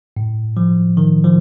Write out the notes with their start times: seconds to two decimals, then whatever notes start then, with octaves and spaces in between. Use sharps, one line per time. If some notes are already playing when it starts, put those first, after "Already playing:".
0.17 A2
0.57 F3
0.97 D#3
1.24 F3